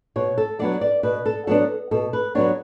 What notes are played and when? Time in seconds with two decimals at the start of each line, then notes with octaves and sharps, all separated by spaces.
0.16 B2 C#5
0.38 A4
0.59 F#3 B3 D4 D5
0.81 D5
1.03 B2 B4
1.26 A4
1.47 F#3 B3 D4 A4
1.91 B2 A4
2.13 B4
2.35 F#3 B3 D4 C#5